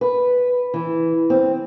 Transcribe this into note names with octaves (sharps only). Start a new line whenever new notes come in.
B4
E3
C4